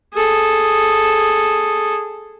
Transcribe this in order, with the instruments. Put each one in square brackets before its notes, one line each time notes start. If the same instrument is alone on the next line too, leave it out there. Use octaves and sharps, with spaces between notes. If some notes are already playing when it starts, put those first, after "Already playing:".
[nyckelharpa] G#4 A4